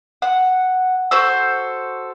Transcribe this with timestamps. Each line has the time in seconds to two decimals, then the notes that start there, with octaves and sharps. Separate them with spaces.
0.22 F#5
1.11 F#4 A4 C5 E6